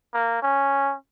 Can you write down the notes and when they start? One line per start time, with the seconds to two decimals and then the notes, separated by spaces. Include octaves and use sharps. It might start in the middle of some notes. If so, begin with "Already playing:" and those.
0.13 A#3
0.42 C#4